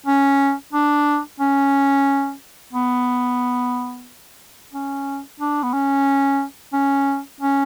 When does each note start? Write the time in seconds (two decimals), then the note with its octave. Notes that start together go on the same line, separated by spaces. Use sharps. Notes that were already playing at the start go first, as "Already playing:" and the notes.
0.06 C#4
0.73 D4
1.40 C#4
2.73 B3
4.73 C#4
5.40 D4
5.63 B3
5.74 C#4
6.73 C#4
7.40 C#4